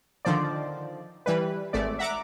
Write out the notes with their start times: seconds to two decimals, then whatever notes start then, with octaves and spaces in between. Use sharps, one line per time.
0.25 D3 D#3 F3 C5 D5
1.26 E3 G3 B4
1.73 G#1 A3 D5
1.99 E5 F#5 A#5 D6